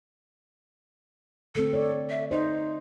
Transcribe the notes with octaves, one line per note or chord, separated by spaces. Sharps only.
D3 A3 C4 A4
C#5 D5
E5
D#4 C5 D#5